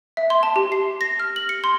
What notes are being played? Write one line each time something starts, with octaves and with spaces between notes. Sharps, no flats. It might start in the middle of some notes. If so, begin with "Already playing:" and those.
E5
C6
A5
G4
C7
A#6
F6
F#7
C#7
C6